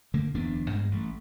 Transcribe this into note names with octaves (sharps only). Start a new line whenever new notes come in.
D3 A3 A#3
D1 E2 B3 D4
G2 G3 G#3
A1 A3